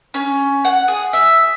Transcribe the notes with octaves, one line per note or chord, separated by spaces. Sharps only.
C#4
F#5
G#4
E5